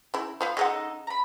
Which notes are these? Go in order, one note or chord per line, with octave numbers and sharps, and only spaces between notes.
C#3 E4
F3 B3 F5
C#3 G#3 D#4 A4 F#5
A#5 B5